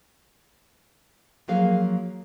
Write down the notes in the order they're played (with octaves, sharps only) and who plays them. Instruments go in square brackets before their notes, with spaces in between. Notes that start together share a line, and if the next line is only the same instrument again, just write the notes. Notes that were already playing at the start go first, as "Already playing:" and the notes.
[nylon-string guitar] F3 F#3 A#3 G#4 F5